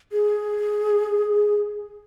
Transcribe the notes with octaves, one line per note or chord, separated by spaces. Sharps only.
G#4